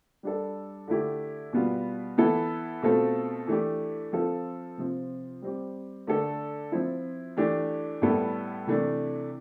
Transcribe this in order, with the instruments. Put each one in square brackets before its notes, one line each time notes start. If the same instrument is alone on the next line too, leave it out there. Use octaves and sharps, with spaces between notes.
[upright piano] G3 D4 A4
D3 A3 E4 G4
B2 G3 B3 F4
E3 B3 E4 A4
B2 A3 C4 F4 A4
E3 A3 D4 G4
F3 C4 F4 A4
C3 F3 C4
G3 C4 G4
D3 A3 D4 A4
F3 C4 E4
E3 A3 D4 G4
A2 G3 B3 E4 A4
C3 E3 A3 D4